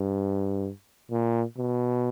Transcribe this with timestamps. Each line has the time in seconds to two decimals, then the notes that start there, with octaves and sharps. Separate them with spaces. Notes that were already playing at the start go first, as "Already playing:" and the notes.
Already playing: G2
1.11 A#2
1.57 B2